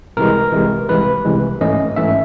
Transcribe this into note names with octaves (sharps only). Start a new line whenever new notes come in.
C2 C3 E3 G#3 A#4
C2 C3 E3 G#3
C2 C3 E3 G#3 B4
C2 C3 E3 G#3
G#2 E3 A3 C#4 D#5
G#2 E3 A3 C#4 E5